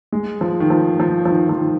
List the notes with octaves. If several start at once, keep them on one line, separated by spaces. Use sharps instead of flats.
G#3
F3
D#3
F3
F3
F3
D#3
F3
D#3